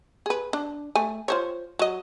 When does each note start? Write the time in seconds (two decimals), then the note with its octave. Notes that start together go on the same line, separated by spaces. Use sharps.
0.26 G#4 B4
0.53 D4
0.95 A3 G#5
1.28 F4 C5 C#5
1.79 F#3 D#5